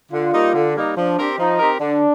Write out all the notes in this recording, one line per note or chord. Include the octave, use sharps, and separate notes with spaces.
D3 F4
G3 A#3 D#4
D3
G3 A#3 D#4
F3 D4
C4 G4 A#4
F3 D#4
C4 G4 A#4
D3 D4